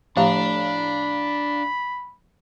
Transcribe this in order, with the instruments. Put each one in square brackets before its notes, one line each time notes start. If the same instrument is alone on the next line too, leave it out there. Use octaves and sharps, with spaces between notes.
[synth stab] A2 F5 A#5 [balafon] F3 A3 G4 [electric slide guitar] D4 [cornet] B5